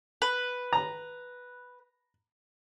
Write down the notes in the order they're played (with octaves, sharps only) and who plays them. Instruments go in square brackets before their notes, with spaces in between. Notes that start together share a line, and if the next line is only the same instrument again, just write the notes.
[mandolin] B4
[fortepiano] A#5